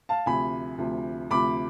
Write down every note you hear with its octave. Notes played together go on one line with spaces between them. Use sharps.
F5 A5
D2 C3 F3 G#5 B5
D2 C3 F3
D2 C3 F3 B5 D6